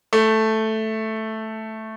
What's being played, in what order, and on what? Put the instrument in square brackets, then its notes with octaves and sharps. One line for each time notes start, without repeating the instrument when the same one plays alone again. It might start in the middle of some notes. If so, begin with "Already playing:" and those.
[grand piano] A3